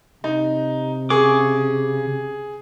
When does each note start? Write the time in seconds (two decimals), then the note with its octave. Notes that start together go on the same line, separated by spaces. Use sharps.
0.24 C3 D#4
1.10 C#3 G#4 C#6 D6